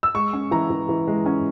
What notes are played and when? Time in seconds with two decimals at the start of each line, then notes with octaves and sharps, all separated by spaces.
0.03 E6
0.14 G#3 C#6
0.33 C#4
0.51 E3 A#5
0.70 E3
0.89 E3
1.07 G#3
1.26 C#4